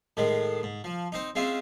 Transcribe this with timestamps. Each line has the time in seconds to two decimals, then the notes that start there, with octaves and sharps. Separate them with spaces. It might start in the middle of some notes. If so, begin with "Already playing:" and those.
0.17 A2 D#3 G#3
0.63 G#2
0.84 F3
1.12 C4 D#4
1.35 G#3 C4 C#4 F4 E5